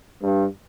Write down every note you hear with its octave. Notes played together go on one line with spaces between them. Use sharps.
G2